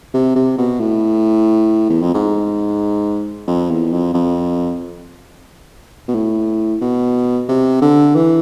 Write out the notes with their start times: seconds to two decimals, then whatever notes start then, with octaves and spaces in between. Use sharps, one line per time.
0.14 C3
0.35 C3
0.58 B2
0.80 A2
1.89 E2
2.02 F2
2.14 G#2
3.47 F2
3.70 E2
3.92 F2
4.14 F2
6.08 B2
6.15 A2
6.81 B2
7.49 C3
7.82 D3
8.15 E3